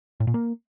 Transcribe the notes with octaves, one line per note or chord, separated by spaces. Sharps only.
A2
A#2
A#3